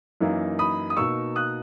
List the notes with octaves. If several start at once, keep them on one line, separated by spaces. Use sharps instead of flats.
F#2 E3 A#3 D#4
B5 D#6
D#6
B2 A#3 D#4 C#6 E6
D#6 F#6